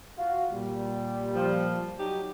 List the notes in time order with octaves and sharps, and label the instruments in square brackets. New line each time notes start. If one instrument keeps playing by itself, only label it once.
[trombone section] F4 F#4
A#2 G3
[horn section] F3
F#3 D#4 G4